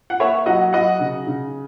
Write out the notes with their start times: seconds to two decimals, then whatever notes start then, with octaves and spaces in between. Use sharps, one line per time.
0.10 F#5
0.20 A#3 C#5 E5
0.46 F#3 D#5 F#5
0.73 F#3 D#5 F#5
1.00 C#3
1.27 C#3